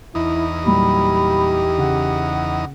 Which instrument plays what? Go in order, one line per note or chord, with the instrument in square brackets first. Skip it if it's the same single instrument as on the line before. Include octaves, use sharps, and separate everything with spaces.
[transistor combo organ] E2 D#4 [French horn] E4
[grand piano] A#2 F#3 G3 [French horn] G4 [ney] B5
[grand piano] C#3 [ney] F#5